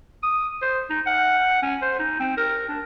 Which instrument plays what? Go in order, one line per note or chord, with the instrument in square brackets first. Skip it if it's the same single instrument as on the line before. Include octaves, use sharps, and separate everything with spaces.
[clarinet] D#6
C5
D#4
F#5
C#4
C5
D#4
C4
A#4
D4